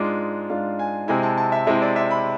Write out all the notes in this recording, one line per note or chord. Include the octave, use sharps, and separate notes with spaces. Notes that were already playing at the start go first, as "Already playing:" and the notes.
Already playing: G#2 G#3 D4 F4 D6
G#2 G#3 D4 F4 F5
G#5
C3 G#3 C4 E4 G#5
A5
A5
E5
C3 G#3 C4 E4 E5
D5
E5
B5